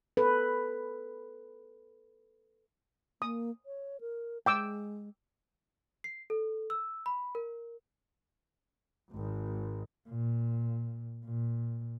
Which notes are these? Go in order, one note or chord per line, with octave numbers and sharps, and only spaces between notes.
A4 B4
A#3 D#6
C#5
A#4
G#3 G5 D6 E6
C7
A4
E6
B5
A#4
G#1
A#2
A#2